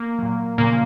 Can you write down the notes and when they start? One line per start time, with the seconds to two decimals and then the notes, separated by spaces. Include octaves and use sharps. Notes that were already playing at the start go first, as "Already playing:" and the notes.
Already playing: A#3
0.19 A#2 F#3
0.58 A#2 C#3 F3 A#3